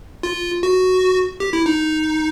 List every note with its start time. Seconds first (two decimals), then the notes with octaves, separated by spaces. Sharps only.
0.23 F4
0.63 F#4
1.40 G4
1.53 E4
1.66 D#4